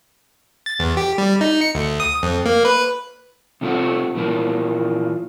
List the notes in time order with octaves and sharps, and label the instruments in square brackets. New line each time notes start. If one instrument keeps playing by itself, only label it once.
[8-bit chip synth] A6
E2
G4
G3
D#4
C#7
D2
D#6
F2
A#3
B4
[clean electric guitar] C3 F3 A3 B3 C4 F#4
A#2 D3 E3 F3 A#3